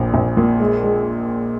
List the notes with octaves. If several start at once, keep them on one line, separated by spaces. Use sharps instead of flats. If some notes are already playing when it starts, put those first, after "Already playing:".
Already playing: A#1 A#2
A#1
A#2
G#3
G#3